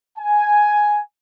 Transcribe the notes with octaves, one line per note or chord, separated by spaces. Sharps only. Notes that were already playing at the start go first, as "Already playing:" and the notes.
G#5